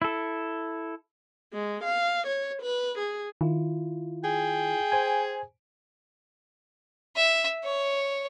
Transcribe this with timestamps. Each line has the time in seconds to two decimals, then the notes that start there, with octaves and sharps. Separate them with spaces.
0.02 E4 A4
1.53 G#3
1.84 F5
2.27 C#5
2.62 B4
2.98 G#4
3.41 D#3 E4 F4
4.24 G#4 G5
4.92 C5 G#5
7.16 E5
7.64 C#5